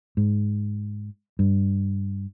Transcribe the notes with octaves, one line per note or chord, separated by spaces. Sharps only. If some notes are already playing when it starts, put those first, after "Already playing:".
G#2
G2